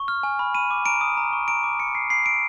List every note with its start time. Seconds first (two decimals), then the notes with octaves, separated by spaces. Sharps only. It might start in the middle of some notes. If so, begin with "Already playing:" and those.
Already playing: C#6
0.08 F6
0.23 G#5
0.39 B5
0.55 B5 D#7
0.71 D6
0.86 A#5 D7
1.01 D#6
1.17 A#5
1.33 C#6
1.48 A#5 D7
1.63 D6
1.79 A#5 C#7
1.95 D#6 C7
2.10 B5 C7
2.26 E6 D7